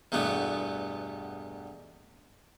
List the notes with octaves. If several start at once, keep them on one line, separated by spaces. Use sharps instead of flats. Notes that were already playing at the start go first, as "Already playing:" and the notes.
E2 G2 B2 A3 B3